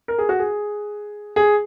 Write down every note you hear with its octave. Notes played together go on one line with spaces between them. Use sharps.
A#4
G#4
F#4
G#4
G#4